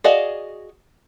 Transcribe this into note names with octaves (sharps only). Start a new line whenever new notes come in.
F#4 G#4 D5 D#5 F5